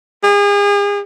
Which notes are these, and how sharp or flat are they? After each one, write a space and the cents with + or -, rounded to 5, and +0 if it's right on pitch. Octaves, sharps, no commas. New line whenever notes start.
G#4 -40